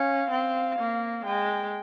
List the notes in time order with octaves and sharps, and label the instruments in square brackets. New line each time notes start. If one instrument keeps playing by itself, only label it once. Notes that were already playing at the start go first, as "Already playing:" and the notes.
Already playing: [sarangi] C#4 [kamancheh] F5
[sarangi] C4
A#3
[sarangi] G#3 [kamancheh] G5